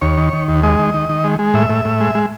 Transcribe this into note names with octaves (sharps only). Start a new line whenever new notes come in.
D#2 C#5
D#3
D#3
D#2
G#3 D#5
D#3
D#3
D#3
G#3
G#3
A2 E5
A2
A2
G#3
G#3